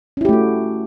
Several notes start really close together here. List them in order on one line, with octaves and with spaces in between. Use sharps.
C#4 E4 G4 A3 F#4